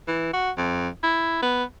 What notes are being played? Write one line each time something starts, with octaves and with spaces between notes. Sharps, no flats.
E3
F#4
F2
E4
B3